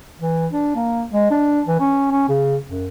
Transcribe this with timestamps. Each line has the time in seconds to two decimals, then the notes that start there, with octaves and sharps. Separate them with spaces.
0.21 E3
0.52 D4
0.75 A#3
1.12 G#3
1.31 D4
1.67 E3
1.80 C#4
2.12 C#4
2.29 C#3
2.67 F#2